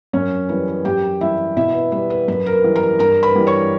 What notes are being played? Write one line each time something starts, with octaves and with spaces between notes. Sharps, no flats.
F#2 C#4 C#5
E3 G3 B4
B4
F#2 G4 G5
E3 G3 E4 E5
B2 E4 E5
B4
G3 B4
B4
F#2 B4
A#4
B4
E3 G3
A#4 A#5
G2 A#4 A#5
B4 B5
E3 G3
C#5 C#6